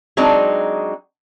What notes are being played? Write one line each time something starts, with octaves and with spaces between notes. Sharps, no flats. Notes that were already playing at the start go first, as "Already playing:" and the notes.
F#3 G#3 C4 D4 D#4 F#4